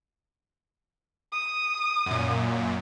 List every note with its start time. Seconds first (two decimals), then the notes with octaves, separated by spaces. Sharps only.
1.32 D#6
2.06 F#2 A#2